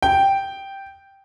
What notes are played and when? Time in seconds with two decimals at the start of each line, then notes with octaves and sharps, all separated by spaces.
0.02 G5